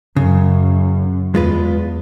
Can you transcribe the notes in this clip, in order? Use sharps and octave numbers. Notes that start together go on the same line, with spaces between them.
F#2 C#3
E2 G#3 F4 B4